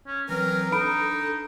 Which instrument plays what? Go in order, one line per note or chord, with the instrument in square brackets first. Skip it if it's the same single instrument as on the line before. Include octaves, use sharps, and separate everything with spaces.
[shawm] C#4
[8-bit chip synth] E3 F#3 C4 [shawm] A#4 [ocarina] B4
[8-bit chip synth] D4 [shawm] D#4 [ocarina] A4 [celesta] A#5 B5 D7